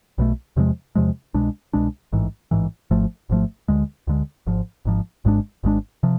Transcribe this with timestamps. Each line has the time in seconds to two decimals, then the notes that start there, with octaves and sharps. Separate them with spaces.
0.18 B1 B2 A3
0.56 E2 C3 F3 G#3
0.95 E2 C3 F3 G#3
1.34 C2 B2 G#3 D4
1.73 C2 B2 G#3 D4
2.12 A1 G#2 E3
2.51 A1 G#2 E3
2.91 G#1 G#2 F3 A3
3.29 G#1 G#2 F3 A3
3.68 D2 D3 G#3
4.07 D2 D3 G#3
4.47 G#1 G#2 F3
4.85 G#1 G#2 F3
5.25 G#1 G#2 G#3 D4
5.64 G#1 G#2 G#3 D4
6.03 C3 F3